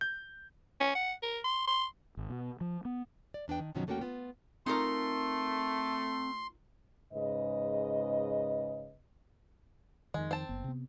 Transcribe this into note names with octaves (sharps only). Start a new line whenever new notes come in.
G6
C#4
F#5
A#4
C6
C6
G#1
B2
F3
B3
D5
E2 D4 B4 G5
D#3
G2 B2 D#3 F3 F#3 C#4
E2 A3 A#3 C#4 F#4 G5
B3 F4
A3 C4 D#4 F4 A#4 C6
G#2 C#3 B4 D#5
F2 D#3 G#3
C4 A5
F#1 B3
C3 B3